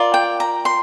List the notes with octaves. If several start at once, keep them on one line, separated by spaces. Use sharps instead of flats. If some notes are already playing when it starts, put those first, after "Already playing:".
Already playing: F4 A#4 D5
G5
A#5
C6